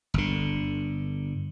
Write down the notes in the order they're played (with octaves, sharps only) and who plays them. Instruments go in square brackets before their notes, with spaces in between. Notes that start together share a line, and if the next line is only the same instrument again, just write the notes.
[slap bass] G1 D3